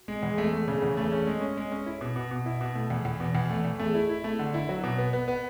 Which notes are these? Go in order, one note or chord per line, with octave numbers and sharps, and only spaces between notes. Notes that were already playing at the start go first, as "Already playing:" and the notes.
Already playing: F#4
G#3
E2 G#4
A3 F#4
A3 G#4
C#3 G#4
E2 F#4
F#4
A3 G#4
C#4
G#3
C#4
G#3 B4
C#4 C#5
B4
E4 A4
B2
B2
B2
E4
B2
A3
E2 A4
E2 C#5
B2 B4
E2
A3
E2
A3 G#4
E4 B4
E4 A4
A3 C#5
D3 F#5
E4 G#5
F#3 F#5
B2 F#5
B3 G#5
B3 F#5
B3